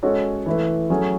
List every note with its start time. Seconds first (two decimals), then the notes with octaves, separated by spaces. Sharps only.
0.03 G#3 C#4 F#4 A4 C#5
0.46 E3 A3 E4 B4
0.90 F#3 A3 C#4 G#4